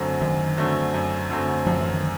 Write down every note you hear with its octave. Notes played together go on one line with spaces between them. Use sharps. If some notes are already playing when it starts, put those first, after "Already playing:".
Already playing: F#2 D3 F#3 A3 C4
F#2 D#3
D3 F#3 A3 C4
F#2
D3 F#3 A3 C4
F#2 F3
E3
D#3